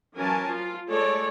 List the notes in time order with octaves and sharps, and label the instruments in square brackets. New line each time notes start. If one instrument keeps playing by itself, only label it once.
[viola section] E3 F#3 C#4 A#4 G#5 A5
F3 F4
G#3 A3 A4 C#5 D5